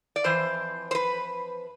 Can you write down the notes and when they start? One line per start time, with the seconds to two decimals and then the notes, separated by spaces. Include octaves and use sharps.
0.16 D5
0.24 F2 E3 C5
0.91 C5
0.95 B4